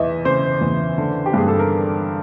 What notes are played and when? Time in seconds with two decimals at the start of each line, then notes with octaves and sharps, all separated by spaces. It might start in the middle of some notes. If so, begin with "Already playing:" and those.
Already playing: E2 E3 D#5 E5
0.25 C#3 C5
0.61 E2
0.98 D3
1.26 G4
1.34 G2 G#4
1.48 A4
1.59 A#4